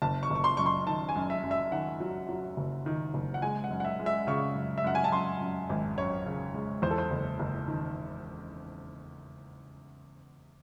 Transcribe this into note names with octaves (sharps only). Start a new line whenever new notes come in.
F#1 A5
C#6
F#1
C#6
C6
F#2 C#6
C6
D#3 A5
G#5
F#2
E5
F#2
E5
D#3 F#5
F#3
F#3
F#1
D#3
F#1
F#5
G#3 G#5
F#5
F#2
F#5
E5
G#3
E5
C#3 C#6
F#2
E5
F#2 F#5
G#5
A5
F#2 C6
F#2
G#1
F#2 C#5
C#3
G#3
E2 C5
A4
C5
F#1
F#1
D#3